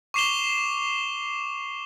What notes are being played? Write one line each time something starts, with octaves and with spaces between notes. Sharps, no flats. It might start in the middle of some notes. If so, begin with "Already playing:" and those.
C#6 D6 C7 E7 F7 G7